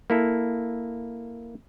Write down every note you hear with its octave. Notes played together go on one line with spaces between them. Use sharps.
A#3 E4 A4